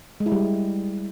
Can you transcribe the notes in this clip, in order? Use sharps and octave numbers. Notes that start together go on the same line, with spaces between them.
G#3
E4
G3